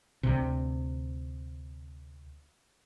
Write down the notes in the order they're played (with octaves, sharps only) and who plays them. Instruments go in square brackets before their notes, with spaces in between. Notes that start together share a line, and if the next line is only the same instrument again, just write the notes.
[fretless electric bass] D2 C3